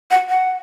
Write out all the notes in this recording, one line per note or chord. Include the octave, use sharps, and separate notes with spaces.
F#5
F#5